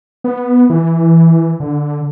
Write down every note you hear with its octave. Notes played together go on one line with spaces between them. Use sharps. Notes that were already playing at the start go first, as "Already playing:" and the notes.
B3
E3
D3